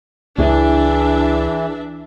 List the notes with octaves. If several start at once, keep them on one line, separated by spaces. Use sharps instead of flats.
C#2 E3 D4 E4 G#4 E5